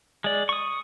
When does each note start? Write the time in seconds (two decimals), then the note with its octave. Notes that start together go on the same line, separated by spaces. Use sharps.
0.24 G#3 D5
0.49 C#6 D#6